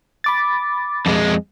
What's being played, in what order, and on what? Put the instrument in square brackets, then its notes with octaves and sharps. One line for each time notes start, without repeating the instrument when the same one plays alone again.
[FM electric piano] B5 D6 A6
[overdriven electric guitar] F2 G#3